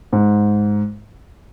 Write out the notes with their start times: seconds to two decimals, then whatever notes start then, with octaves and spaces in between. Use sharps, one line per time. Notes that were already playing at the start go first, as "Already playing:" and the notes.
0.13 G#2